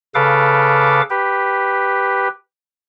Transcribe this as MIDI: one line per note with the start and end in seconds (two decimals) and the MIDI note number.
0.15 1.02 49
0.15 1.02 69
0.15 1.02 71
0.15 1.02 77
0.15 1.02 86
1.10 2.29 67
1.10 2.29 71